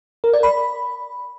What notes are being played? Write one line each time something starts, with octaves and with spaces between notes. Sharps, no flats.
A#4
D5
B5